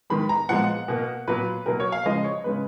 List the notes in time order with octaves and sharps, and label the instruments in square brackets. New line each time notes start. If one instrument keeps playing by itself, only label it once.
[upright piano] D#3 G#3 B3 B5
A#5
A#2 F3 G#3 B3 F#5
B2 A#3
A#2 F#3 B3 B4
B2 F#3 A#3 A#4
C#5
F5
C#3 F3 G#3 D#5
C#5
C#3 G#3 B3 B4